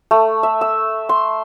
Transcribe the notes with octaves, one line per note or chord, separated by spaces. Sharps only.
A3
E5
E6
C6